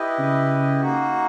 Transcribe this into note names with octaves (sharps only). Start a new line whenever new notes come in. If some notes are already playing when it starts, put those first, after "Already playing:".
Already playing: E4 G4 B4 D#5
C#3
A#3 D#4 F#4